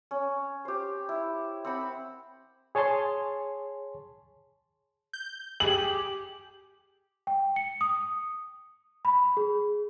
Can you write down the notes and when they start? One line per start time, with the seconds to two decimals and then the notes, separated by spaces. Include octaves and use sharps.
0.11 C#4
0.65 G4 C5
1.09 E4
1.65 C4 F#5 B5
2.75 G#4 C#5 G#5 A5 C6
5.13 G6
5.60 G4 G#4 F#7
7.27 G5
7.56 C#7
7.81 D#6
9.05 B5
9.37 G#4